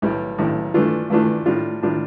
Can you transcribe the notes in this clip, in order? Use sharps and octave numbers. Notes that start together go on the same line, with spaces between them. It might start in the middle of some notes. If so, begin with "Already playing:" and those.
B1 A2 G3
B1 A2 G3
G2 E3 A3 D4 F4
G2 E3 A3 D4 F4
A2 G3 D4 F4
A2 G3 D4 F4